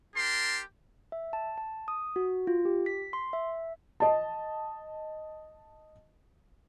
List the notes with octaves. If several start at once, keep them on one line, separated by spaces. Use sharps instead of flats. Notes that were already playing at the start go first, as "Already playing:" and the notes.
D4 G4 A#4 A5 C6
E5
A5
A5
D#6
F#4
F4
G4
B6
C6
E5
D#5 A5